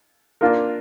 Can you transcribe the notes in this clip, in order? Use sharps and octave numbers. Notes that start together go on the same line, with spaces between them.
A#3 D4 F4 A#4